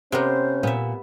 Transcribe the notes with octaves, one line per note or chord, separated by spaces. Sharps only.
C3 B3 C#4 A#4 C5
A#2 B3 E5